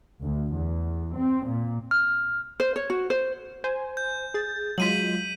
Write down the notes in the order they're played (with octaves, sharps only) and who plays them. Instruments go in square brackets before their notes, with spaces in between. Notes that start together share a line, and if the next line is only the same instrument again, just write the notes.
[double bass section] D2
E2
C4
A#2
[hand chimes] F6
[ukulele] C5
C#5
F#4
C5
[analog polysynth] C5 G#5
[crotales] G6
[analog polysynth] G#4 A6
[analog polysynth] F#3 G#3 F4 [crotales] B6 D#7 F#7